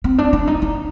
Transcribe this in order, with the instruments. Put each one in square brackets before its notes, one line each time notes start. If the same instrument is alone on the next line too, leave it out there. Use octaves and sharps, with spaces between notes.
[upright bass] C4
D4
D4
D#4
D#4